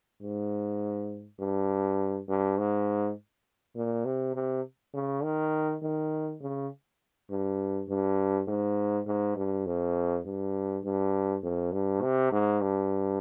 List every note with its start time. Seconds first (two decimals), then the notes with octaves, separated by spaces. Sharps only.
0.22 G#2
1.39 G2
2.28 G2
2.58 G#2
3.75 A#2
4.05 C3
4.35 C3
4.94 C#3
5.23 D#3
5.82 D#3
6.41 C#3
7.30 G2
7.89 G2
8.48 G#2
9.07 G#2
9.36 G2
9.66 F2
10.25 G2
10.84 G2
11.43 F2
11.72 G2
12.02 C3
12.31 G#2
12.61 G2